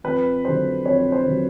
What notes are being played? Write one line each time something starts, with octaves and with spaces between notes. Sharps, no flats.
F2 B4
D3 F#3 C5
F2 C#5
C5
D3 F#3